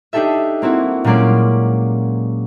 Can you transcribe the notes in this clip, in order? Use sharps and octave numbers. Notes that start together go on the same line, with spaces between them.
D4 D#4 G4 A4 E5
A#3 C4 E4 F#4
A#2 F#3 G#3 A#3 C#4 D5